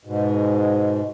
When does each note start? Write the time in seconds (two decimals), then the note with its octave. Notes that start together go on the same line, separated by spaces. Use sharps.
0.05 G#2 B2